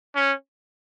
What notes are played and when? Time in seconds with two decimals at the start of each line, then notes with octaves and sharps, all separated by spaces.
0.16 C#4